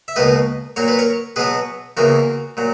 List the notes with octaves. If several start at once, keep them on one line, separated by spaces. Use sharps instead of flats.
E5
C#2 B2 A#3 B4 D#5
A#2 F#3 A#3 C#5
B4
A#4 C#5
B2 F#3 B3 G#4 B4
E2 C#3 E3 A#3 F#4 A#4
A#2 F#3